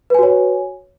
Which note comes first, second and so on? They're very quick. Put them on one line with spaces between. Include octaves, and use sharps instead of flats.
B4 G#5 F#4 C#5